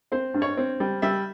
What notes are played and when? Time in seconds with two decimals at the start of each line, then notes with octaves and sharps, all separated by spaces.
0.12 C4 C5
0.34 G2
0.42 C#5
0.57 C4
0.80 G3
1.02 G3 E5